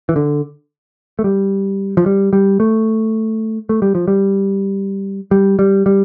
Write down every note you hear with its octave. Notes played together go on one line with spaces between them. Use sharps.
E3
D3
A3
G3
F3
G3
G3
A3
A3
G3
F3
G3
G3
G3
G3